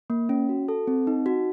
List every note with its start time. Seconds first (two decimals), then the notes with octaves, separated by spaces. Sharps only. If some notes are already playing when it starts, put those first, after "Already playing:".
0.10 A#3
0.29 C#4
0.49 F#4
0.68 A4
0.87 C4
1.07 D#4
1.26 F#4